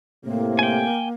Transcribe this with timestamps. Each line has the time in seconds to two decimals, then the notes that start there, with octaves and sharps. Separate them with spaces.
0.25 A2 C3 A#3
0.59 G5 G#5